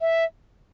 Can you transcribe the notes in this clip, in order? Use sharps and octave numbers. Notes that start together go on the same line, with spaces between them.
E5